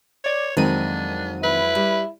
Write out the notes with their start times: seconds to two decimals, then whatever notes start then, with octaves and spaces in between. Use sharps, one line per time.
0.24 C#5 D5 G#6
0.57 F2 D#3 F#3 G#3 C4 D4 D#7
1.43 E4 B4
1.75 G3